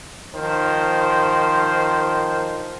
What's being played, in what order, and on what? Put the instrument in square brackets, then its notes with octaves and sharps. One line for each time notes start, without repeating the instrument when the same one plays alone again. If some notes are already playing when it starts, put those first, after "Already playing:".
[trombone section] D#3 F3 C5